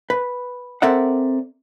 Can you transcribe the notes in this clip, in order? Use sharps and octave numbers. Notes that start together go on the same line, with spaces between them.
B4
C4 A4 A#4 D5 E5 F#5